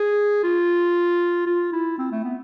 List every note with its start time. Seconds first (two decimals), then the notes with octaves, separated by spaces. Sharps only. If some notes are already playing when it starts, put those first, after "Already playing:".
Already playing: G#4
0.44 F4
1.47 F4
1.73 E4
1.98 C4
2.12 A3
2.24 B3